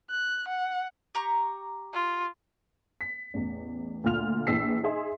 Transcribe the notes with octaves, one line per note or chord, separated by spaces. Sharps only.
F#6
F#5
G4 A#5 C#6
F4
B6
A1 E2
D2 A#2 F4 F6 F7
A#1 E3 G#4 E6 B6 C7
D#4 G#4 E5 C6